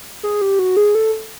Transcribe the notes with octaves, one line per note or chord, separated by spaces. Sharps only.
G#4
G4
F#4
G#4
A4